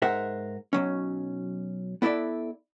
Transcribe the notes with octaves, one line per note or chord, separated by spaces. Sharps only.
G#2 A#4 C5 E5 F#5
B1 F#3 C#4
B3 E4 A4 D5 E5